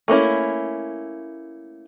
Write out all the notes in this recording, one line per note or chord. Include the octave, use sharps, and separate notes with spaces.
A3 A#3 C#4 E4